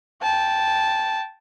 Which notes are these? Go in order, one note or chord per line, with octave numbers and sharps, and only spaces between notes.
G5 A5